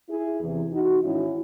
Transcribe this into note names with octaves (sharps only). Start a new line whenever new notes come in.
E4 G#4
E2 C3 E3
D#4 F#4
G#2 D#3 C#4 E4